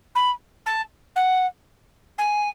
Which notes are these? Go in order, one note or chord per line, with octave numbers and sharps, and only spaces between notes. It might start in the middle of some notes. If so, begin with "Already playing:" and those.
B5
A5
F#5
G#5